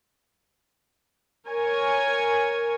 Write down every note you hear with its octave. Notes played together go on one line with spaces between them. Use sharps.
A#4 C#5 G#5